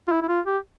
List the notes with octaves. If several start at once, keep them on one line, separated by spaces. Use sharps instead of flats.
F4
E4
E4
F4
G4